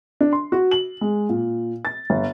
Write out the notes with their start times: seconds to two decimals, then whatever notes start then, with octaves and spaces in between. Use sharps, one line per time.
0.21 D4
0.33 C6
0.52 F#4
0.71 F#7
1.01 G#3
1.29 A#2
1.85 A6
2.10 G1